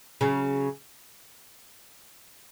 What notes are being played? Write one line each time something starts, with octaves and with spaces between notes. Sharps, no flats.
C#3 F#3